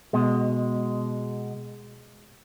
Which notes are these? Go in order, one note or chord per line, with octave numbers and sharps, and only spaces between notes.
B2 G#3